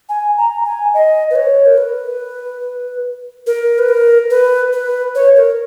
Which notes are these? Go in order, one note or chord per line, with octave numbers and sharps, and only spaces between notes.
G#5
A#5
G#5
D#5
B4
C#5
A#4
B4
A#4
B4
A#4
B4
B4
C#5
A#4